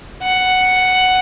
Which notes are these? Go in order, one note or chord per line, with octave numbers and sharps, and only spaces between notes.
F#5